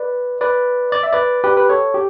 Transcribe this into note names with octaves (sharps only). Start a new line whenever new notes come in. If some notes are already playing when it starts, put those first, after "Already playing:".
Already playing: B4 D5
B4 D5
D5
E5
B4 D5
G4 B4
B4
A4 C#5
G4